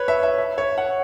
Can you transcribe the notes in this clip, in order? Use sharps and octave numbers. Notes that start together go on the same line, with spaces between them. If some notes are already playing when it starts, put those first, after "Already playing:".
Already playing: B4 C#5
E5
E5
E5
C#5
F#5